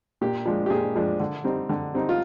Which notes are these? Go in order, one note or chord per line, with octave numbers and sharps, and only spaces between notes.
A#2 G4
F3 G#3 D4
G4
A#2 G#4
F3 G#3 D4
D3
G3 C4 D#4
D3
G3 C4 D#4
F4